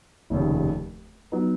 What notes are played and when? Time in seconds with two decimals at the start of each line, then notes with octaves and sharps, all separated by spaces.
0.30 F1 D#2 C#3
1.32 F#3 B3 D#4